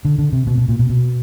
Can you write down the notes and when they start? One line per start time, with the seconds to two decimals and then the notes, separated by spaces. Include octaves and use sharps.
0.05 D3
0.19 D3
0.32 C3
0.47 B2
0.58 B2
0.69 A#2
0.79 B2
0.89 B2